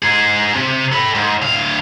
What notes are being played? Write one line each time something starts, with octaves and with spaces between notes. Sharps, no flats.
G#2 G#4
C3
A4 B5
G#2
D2 F5